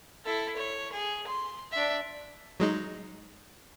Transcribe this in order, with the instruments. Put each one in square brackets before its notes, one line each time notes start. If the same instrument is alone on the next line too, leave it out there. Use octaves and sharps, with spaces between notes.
[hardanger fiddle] E4 A4
C#5
G#4
C6
D4 E5
[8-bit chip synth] F#3 G#3 D#4